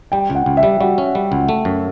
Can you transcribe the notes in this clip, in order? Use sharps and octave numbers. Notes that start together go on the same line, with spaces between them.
G3 G5
C#2 F#5
C#2
E5
G3
G3 F#4
C#4
G3
C#2
A3
F#2